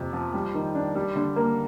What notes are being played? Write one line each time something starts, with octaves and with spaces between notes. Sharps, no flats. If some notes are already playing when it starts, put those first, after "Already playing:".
Already playing: F2 C3
F3
G3
D#3
D4
G3
D3
A#3